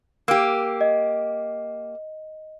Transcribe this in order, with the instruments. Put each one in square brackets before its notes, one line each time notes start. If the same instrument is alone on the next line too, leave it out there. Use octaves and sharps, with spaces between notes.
[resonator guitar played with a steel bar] A#3 G4 [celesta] E6
[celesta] D#5